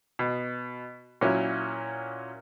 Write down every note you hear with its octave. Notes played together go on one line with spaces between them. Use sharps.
B2
A#2 F#3 C#4 E4